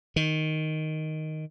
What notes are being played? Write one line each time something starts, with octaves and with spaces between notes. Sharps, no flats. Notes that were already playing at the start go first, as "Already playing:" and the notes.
D#3